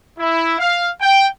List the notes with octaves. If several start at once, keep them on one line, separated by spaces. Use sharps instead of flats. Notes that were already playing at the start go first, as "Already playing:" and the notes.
E4
F5
G5